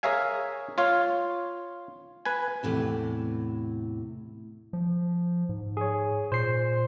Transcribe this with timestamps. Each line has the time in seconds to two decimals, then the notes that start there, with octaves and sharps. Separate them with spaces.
0.03 G#4 A#4 C#5 E5 F5 G#5
0.78 F4 C#5 F5
2.25 B4 G#5
2.63 E2 A2 C3 A5
4.73 F3
5.49 G#2
5.77 G#4 C#5
6.32 A#2 C5 C7